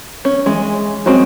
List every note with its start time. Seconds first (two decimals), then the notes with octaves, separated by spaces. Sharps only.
0.25 C#4
0.46 E3 G#3
1.06 G#3 C4 C#4 F#4